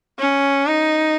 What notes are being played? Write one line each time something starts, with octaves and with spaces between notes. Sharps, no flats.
C#4
D#4